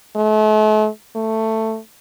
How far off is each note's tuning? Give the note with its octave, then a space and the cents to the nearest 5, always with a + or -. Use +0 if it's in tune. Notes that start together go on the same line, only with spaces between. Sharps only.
A3 -40
A3 +10